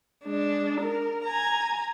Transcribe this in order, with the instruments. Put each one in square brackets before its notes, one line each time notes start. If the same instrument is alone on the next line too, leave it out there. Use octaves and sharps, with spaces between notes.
[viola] G#3 D4
A#4
G#5 A#5